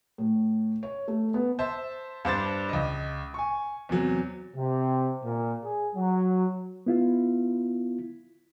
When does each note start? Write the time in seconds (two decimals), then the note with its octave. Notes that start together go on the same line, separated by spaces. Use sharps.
0.18 A2
0.83 C#5
1.08 A3
1.34 B3
1.59 C5 E5 A5
2.25 G2 D4 C5 A6
2.69 C#2 D#5
3.34 G#5 C#6
3.89 E2 C3 F#3
4.55 C3
5.24 A#2
5.63 G#4
5.95 F#3
6.86 B3 E4 F4